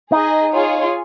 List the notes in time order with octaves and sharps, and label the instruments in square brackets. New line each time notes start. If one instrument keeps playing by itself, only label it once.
[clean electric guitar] D#4 [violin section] G#4 D#5 G#5
[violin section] F4 G#4 C#5 G#5